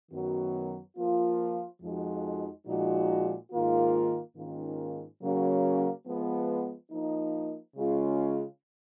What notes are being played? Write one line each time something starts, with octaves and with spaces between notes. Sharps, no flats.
F#2 D#3 F#3 B3 F#4
F3 A#3 F4
F2 F3 G#3 D#4 F#4
A#2 F3 G#3 D#4 F#4
G#2 D#3 A#3 F4
G#2 D#3 A#3 C#4 F4
C#3 F#3 A#3 C#4 F#4
F3 G#3 B3
F3 A#3 D#4
C#3 G#3 C#4 F4